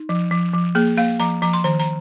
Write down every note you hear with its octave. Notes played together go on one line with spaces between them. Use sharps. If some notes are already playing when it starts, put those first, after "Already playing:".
Already playing: D#4
F3
F3
F3
A#3 G#4
A#3 F5
F3 A#5
F3 A#5
C6
D#3 A#5
A#5